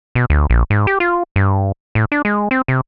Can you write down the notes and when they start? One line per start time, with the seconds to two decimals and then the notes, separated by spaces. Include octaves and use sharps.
0.15 B2
0.30 D2
0.50 A#1
0.70 G#2
0.87 G4
1.00 F4
1.36 G2
1.95 A2
2.12 D4
2.25 G#3
2.51 C4
2.68 C3